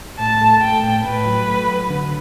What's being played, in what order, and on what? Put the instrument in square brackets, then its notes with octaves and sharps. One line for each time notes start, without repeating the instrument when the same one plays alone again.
[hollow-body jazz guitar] A2 [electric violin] A5
[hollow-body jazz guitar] A3
[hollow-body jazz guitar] A3 [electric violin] G5
[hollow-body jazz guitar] A2
[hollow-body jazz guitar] A2 [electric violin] B4
[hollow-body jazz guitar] F#3
A3
F#3
D3